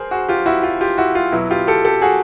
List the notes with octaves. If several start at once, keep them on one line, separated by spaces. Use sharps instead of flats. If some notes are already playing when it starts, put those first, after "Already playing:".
Already playing: G#4 A#4 C5
F#4 G#4
F4 G4
E4 F#4
F4
F4 G4
E4 F#4
F4
B2 F#3 E4
F4 G4
G4 A4
G4 A4
F#4 G#4